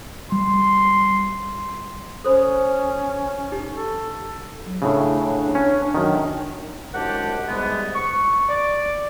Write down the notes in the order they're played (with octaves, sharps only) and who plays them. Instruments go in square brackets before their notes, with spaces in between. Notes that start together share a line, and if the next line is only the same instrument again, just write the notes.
[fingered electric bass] G3 [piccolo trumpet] C6
[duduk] C#4 [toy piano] A4 C5 B5
[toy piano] D#4 G4
[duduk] A4
[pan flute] F#3
[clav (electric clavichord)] A2 C#3 [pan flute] D4
[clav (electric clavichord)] C#4
F#2 D#3
[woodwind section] C2 F#2 G#3 D4 G4 F#5
G#2 C3 G3 G#3 B3
C#6
D5